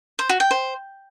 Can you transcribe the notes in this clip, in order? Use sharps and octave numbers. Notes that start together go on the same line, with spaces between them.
C5
F#4
G5
C5